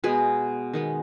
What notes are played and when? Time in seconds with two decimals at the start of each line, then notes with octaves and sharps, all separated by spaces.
0.04 B2 G#3 B3 G#4 B4
0.74 D#3 G#3 B3